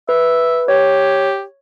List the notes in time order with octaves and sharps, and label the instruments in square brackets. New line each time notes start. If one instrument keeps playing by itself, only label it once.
[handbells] B4 [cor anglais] E5
[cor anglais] G4 [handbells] C#5